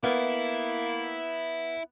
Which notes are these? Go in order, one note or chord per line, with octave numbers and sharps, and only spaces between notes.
A#3 B3 E4